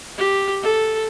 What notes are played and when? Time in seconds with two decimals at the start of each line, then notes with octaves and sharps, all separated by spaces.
0.18 G4
0.62 A4